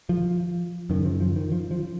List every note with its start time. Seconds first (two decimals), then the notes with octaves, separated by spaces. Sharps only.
0.09 F3
0.90 F#2 D#3
0.94 C#3
1.05 F3
1.20 F3
1.36 D#3
1.52 F3
1.71 F3